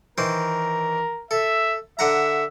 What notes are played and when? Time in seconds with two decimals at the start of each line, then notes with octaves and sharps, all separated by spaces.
0.18 D#3 E3 A#4 C5
1.31 A4 E5
1.99 D3 E5 F#5 A#5